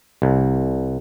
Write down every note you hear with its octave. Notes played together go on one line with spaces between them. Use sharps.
C2